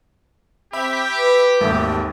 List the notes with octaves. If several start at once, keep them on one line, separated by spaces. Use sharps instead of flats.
C4 G4 E5 B5
B4
G#1 D#2 G3 A3